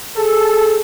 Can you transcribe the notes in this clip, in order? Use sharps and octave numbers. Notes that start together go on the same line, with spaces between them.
G#4 A4